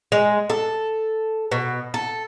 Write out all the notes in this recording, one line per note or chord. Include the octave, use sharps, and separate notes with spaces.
G#3
A4
B2
A4